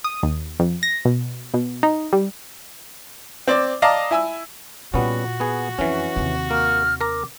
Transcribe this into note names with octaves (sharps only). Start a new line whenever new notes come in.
D#6
D#2
F2
A#6
B2
B2
D#4
G3
C4 D5 D6
D5 D#5 F5 A5 A#5 D6
E4 G#5 E6
A#2 G3 B3 C#4 F#4
B3 G#4
F2 E3 C#4
D#2 C3
A#3 F6
A#4 A#5 D6